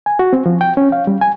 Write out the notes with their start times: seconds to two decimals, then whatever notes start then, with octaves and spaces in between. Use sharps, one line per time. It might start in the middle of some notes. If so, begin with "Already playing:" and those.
0.06 G#5
0.19 F#4
0.33 C4
0.46 F3
0.61 G5
0.77 C#4
0.92 F5
1.07 G3
1.21 G#5